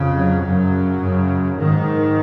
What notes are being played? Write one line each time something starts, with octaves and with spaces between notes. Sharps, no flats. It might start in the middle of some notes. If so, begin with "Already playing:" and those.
Already playing: F2 C#3
F#3
F#2 C#3
F#2 C#3
G#2 D#3